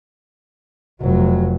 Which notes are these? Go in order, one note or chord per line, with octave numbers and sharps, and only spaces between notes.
F1 F#3